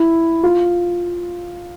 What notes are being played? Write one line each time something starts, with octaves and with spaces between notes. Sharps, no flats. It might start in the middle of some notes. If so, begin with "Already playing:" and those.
Already playing: E4
F4